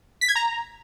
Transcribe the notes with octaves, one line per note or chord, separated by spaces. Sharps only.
B6
G#6
A#5